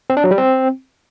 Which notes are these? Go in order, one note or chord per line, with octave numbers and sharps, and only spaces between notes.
C4
D4
F#3
G3
C4